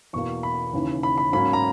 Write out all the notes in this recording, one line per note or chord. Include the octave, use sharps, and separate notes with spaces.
E2 B2 A#3 C#6
B5
D#2 C#3 E3
B5
B5
G#2 F#3 A#3 C#4 B5
A#5